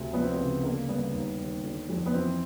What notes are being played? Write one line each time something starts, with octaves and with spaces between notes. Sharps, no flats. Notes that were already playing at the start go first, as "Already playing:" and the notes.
Already playing: D2 C3
F3 B3
C4
B3
C#3
D3 A#3
G2 B3
D#2
D#2
D3
F2
B3
E3 C4